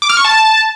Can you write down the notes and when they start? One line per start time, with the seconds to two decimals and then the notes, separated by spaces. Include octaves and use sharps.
0.02 D6
0.10 F6
0.17 C#6
0.25 A5